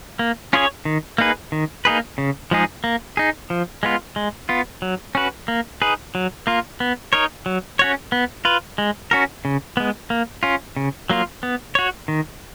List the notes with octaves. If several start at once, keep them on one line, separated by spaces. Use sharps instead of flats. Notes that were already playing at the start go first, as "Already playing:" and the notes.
A#3
C#4 F4 G#4 C#5
D#3
A#3 D#4 G#4 B4
D#3
A#3 D#4 G#4 B4
C#3
F3 G#3 D#4 G#4
A#3
D#4 G#4
F3
G#3 B3 F4
G#3
B3 F4
F#3
C#4 F#4 B4
A#3
D#4 G#4 B4
F#3
A#3 F4
B3
D#4 A#4 C#5
F#3
C#4 F#4 C#5
B3
F4 B4
G#3
C#4 F#4 A#4
C#3
G#3 B3
A#3
C#4 F4
C#3
F#3 A#3 F4
B3
F#4 C#5
D#3